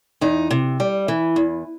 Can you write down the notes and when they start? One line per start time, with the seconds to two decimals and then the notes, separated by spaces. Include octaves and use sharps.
0.21 E2 D#4
0.51 C3
0.80 G3
1.08 E3
1.36 E2